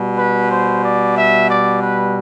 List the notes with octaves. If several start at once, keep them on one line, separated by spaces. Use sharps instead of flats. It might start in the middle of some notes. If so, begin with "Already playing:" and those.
Already playing: B2 G3
B4
C5
D5
E5
D5
B4